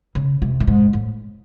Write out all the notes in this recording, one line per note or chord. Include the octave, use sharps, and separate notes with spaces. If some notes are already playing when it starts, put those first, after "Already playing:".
C#3
C3
A2
G#2
A2